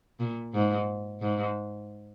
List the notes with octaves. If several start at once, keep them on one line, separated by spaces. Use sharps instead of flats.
A#2
G#2
G#2